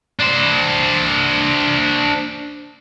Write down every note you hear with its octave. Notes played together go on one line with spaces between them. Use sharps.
D4 C5